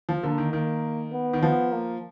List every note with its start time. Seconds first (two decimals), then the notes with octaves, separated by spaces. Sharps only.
0.09 F3
0.23 D3 A#3
0.38 D#3
0.53 D#3 A#3
1.12 B3
1.33 D#3
1.42 F3 B3
1.72 A#3